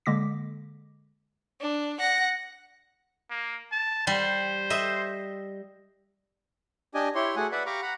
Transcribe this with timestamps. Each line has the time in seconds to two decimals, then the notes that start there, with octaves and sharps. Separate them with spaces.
0.06 D3 G#3 A#3 D6 A#6 B6
1.61 D4
2.00 F#5 A#6
3.31 A#3
3.72 A5
4.07 G3 C5
4.70 D#5 E5
6.94 D4 G4 D#5 G#5
7.15 E4 G4 C#5 C6
7.36 A3 F#4 G#4 F#5 G#5
7.52 B4 D5 E5 F#5 B5
7.66 G4 F5 A#5 B5 C#6 D6
7.82 F#5 A#5 B5